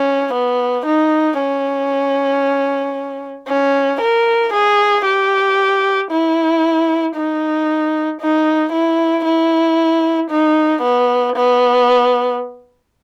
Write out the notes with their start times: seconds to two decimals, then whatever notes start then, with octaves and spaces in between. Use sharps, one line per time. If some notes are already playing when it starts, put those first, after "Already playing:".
Already playing: C#4
0.34 B3
0.86 D#4
1.38 C#4
3.48 C#4
4.01 A#4
4.53 G#4
5.05 G4
6.11 E4
7.15 D#4
8.21 D#4
8.73 E4
9.25 E4
10.31 D#4
10.83 B3
11.36 B3